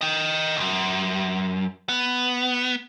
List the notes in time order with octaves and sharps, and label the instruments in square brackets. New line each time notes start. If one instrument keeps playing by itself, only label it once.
[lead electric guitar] D#5 G5
C2 F#2
B3